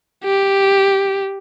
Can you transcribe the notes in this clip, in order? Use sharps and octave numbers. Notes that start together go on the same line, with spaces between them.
G4